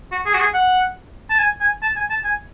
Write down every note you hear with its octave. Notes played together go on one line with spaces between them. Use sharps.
F#4
G#4
F#4
G#4
F#5
A5
G#5
G#5
A5
G#5
A5
G#5